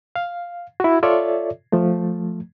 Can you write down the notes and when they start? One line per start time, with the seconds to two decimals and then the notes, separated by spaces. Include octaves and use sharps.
0.16 F5
0.80 E4 F#4
1.03 F4 A4 C#5 D5 E5
1.72 F3 A3